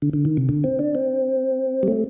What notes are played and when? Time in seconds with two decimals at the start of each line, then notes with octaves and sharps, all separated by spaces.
0.02 D3
0.13 D3
0.25 D#3
0.37 C3
0.49 D3
0.64 C4
0.79 D4
0.95 C4
1.83 G3
1.88 A3